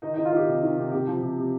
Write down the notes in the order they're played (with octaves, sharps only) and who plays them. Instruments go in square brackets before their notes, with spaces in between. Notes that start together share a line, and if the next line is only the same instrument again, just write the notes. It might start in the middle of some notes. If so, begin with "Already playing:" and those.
[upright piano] D#3 D#4
D#3 D#4
F4
D#3 G4
C3
D#3
C3
C3 G4
F3
C3
C3